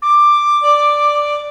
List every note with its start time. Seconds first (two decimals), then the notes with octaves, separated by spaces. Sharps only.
0.02 D6
0.63 D5